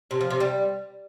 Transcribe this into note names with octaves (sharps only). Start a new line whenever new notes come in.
C3
F3
C3
G3